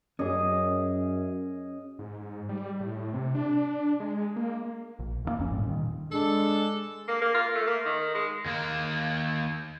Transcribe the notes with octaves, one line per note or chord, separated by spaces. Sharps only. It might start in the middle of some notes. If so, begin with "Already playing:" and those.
F#2 C#4 G#4 D#5
G#2
G3
A2
C3
D4
G#3
A#3
A#1
D#2 C#3 A#3
F1 F2 C#4
G1 A2 G3
A#2 D#3
G#3 D4 A4
A#3
A#3
F4
A3
A#3
D#3
G#3
D#2 A#3